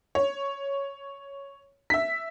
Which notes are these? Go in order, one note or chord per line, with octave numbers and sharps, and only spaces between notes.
C#5
E5 B6